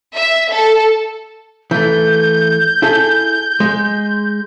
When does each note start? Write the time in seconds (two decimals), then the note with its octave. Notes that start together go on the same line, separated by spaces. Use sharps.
0.15 E5
0.52 A4
1.71 E3 A3 G6
2.82 E4 G#4 A4
3.60 G#3